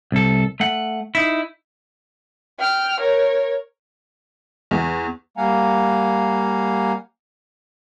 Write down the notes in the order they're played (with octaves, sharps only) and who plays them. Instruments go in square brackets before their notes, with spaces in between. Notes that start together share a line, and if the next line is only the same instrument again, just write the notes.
[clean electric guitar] C2 A4
A3 F#5
D#4 E4
[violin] G5 F6
A#4 C#5
[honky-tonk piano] E2
[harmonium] G3 A#3 F5 F#5 G#5 A#5